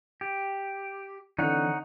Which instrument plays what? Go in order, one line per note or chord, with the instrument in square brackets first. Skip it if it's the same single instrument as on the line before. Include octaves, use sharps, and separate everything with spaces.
[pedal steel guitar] G4
[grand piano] D3 C4 F7 [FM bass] E3 [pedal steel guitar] D#4 C#5 F#5